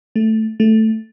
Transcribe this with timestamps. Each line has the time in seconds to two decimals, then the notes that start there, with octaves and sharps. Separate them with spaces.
0.16 A3
0.60 A3